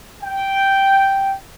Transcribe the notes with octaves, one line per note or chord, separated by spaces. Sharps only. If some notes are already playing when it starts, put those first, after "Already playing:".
G5